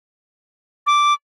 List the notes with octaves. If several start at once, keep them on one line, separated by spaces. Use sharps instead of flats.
D6